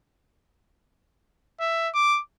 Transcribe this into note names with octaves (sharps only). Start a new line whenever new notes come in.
E5
D6